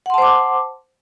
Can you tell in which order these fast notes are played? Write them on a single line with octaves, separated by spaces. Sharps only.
F#5 C6 A5 C5 D6